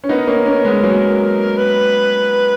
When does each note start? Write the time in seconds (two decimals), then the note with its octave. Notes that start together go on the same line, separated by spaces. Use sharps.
0.04 C#4
0.09 B3 D#4 A#4
0.27 A#3 C#4
0.46 A#3 C#4
0.65 G#3 B3
0.83 F#3 A#3
1.58 B4